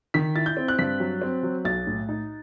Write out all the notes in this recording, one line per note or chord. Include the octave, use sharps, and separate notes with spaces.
D#3 B6
E4 A6
G6
C4
F#6
G2 B6
F#3
C4
F#3
B1 A6
A2
D#4